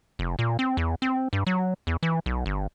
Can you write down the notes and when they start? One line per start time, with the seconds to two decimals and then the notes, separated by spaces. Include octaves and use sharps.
0.19 F1
0.39 A#2
0.59 C4
0.77 E2
1.02 C4
1.33 G2
1.47 F#3
1.87 E2
2.03 E3
2.26 B1
2.46 G1